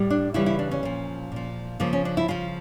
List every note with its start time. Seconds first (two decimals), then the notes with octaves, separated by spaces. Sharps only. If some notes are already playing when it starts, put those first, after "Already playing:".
Already playing: A2 G3
0.10 D4
0.34 C#3 E3 G3 E4
0.46 E4
0.59 D4
0.71 C#4
0.83 A#2 F3
1.32 A#2 F3
1.80 C#3 F3 A#3
1.93 C#4
2.05 D4
2.17 E4
2.28 C#3 F3 F4